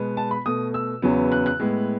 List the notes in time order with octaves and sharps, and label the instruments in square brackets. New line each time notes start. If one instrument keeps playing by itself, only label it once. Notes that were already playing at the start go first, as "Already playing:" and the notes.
Already playing: [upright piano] B2 G#3 B3
A5
B5
B2 A3 D#6
E6
E2 C#3 F#3 B3
F#6
F#6
A2 G#3 B3